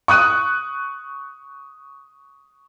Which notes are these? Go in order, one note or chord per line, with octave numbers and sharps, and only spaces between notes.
C#6 D#6 F#6 D#7